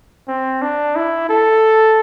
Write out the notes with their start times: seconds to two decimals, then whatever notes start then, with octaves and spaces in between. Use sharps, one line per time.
0.28 C4
0.62 D4
0.96 E4
1.30 A4